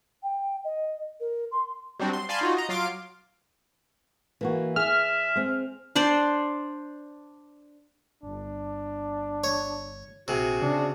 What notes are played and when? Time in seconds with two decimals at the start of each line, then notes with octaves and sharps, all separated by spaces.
0.23 G5
0.64 D#5
1.20 A#4
1.51 C6
1.99 F#3 G3 C4 D4 F#4
2.13 C6
2.29 D5 F5 G#5 A5 B5 C6
2.41 D#4 F4 F#4
2.57 D#5 A#5
2.69 F#3 F4 F5 C6 D6 D7
4.41 E3 A#3 F#4
4.76 G#4 E5 F6
5.36 G#3 C4
5.96 D4 C5 D5
8.23 G1 D4
9.44 C#5
10.28 A#1 C3 F#4 G#4
10.62 C#3 D4